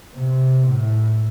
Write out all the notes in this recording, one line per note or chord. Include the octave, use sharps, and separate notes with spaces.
C3
A2